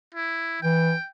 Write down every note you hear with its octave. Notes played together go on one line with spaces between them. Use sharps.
E4
E3 G5